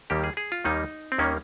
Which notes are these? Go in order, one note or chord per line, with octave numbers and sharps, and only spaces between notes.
D#2 D#3 G3 A#3 G4
G#4
G#4
F4
D#2 D#3 G3 A#3 D#4
C4
D#2 D#3 G3 A#3 C#4